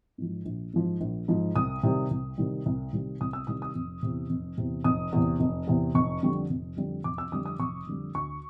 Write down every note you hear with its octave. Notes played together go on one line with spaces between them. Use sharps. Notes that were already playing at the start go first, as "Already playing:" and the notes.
G#2 F3
A#1
G#2 F3
A#1
G#2 F3
C2 D#6
C3 D#3 G3
C2
C3 D#3 G3
C2
C3 D#3 G3
C2 D#6
E6
C3 D#3 G3 D#6
D#6
F1
E2 C3
F1
E2 C3
F1 D#6
E2 C3
F1
E2 C3
F1 C#6
F2 D3 G3
F1
F2 D3 G3
F1 D6
E6
F2 D3 G3 D#6
D#6
F1 C#6
F2 D3 G3
D2 C#6